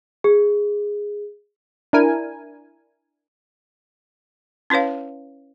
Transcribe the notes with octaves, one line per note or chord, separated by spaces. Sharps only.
G#4
D4 E4 A#4 G#5
C#4 E4 B4 C#5 F5